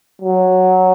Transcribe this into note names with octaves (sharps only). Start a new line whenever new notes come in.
F#3